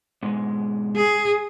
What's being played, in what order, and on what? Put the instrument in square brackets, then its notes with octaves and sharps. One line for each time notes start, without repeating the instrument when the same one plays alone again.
[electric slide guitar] G#2 B2 G#3
[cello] G#4